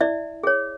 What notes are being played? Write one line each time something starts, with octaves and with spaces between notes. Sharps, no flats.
E4 D5 E5
G#4 C#5